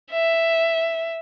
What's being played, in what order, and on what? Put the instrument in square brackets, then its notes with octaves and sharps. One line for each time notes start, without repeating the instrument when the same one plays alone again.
[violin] E5